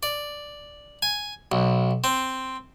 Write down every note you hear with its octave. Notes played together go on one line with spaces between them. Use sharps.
D5
G#5
B1
C4